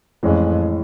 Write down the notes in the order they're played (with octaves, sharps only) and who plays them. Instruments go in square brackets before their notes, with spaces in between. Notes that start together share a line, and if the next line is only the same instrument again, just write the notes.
[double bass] F2 [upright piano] A2 E3 G#3 C#4